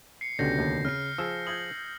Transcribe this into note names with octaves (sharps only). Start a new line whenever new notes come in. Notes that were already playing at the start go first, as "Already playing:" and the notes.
C7 C#7
C#2 B2 D3 C#4 G4 G6 A#6
D#2
C#3 F6 C7
F3 G#4 E6
D#6 G6 G#6 F#7